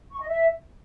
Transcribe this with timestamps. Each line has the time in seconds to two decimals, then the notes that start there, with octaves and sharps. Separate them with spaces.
0.11 C#6
0.20 D#5
0.28 E5